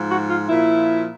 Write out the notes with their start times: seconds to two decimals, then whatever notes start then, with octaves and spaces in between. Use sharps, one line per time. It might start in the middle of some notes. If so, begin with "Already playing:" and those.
Already playing: G#2 F3
0.10 F#4
0.30 F4
0.48 A#2 F3 E4